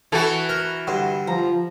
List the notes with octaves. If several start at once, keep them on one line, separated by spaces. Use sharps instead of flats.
E3 F#4 A4 B4 B5
A#4
G2 D3 C6
F3 A#5